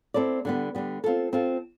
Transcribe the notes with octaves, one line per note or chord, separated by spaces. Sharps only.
C4 E4 A4 D5
D3 G3 B3
D3 G3 B3
C4 F4 A4
C4 F4 A4